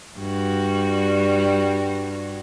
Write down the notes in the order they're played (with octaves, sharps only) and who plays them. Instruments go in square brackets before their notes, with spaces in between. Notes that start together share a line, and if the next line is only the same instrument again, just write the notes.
[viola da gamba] G2 G3 F#4